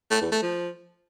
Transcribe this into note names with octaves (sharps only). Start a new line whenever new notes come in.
A3
E2
A3
F3